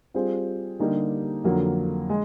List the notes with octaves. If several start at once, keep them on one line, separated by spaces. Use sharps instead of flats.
G3 C4 F4 G#4 C5
D3 G3 A#3 D#4 G4
F2 D3 F#3 A#3
G#3